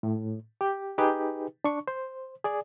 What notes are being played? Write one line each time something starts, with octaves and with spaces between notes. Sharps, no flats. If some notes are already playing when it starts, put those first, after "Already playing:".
A2
G4
D#4 G4 G#4 B4
D4 C#6
C5
G#4 D5